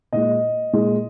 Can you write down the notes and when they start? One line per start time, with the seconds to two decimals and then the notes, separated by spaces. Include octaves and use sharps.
0.13 A#2 G#3 D#5
0.73 A#2 G#3